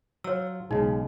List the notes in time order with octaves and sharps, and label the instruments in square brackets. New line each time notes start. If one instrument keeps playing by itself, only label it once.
[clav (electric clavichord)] F#3 F4 [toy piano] C#5 E6
[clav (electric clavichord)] B1 C#3 [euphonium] G#3 [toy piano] D#4